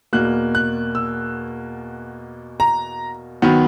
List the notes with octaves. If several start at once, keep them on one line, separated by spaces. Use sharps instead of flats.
E2 B2 A#3 F#6
F#6
E6
A#5
D#3 F#3 B3